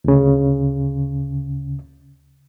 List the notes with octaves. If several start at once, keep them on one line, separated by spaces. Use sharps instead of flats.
D2 C#3